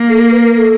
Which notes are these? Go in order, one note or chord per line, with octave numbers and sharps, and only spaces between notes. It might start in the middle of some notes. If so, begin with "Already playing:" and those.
Already playing: A#3
A4
A#4
B4
A#4
A#4
A4